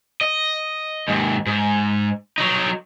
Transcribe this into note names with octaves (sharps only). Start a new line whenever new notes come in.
D#5
D#2 G#2
G#2
F#3 D#4